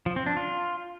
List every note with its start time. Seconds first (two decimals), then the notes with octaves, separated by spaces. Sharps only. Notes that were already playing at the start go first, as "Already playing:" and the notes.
0.06 F3
0.16 C4
0.26 D4
0.37 F4